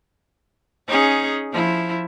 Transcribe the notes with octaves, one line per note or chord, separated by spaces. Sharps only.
C#4 D#4 G#4
F3 E4